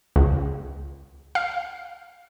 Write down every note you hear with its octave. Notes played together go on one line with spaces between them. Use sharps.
C#2
F5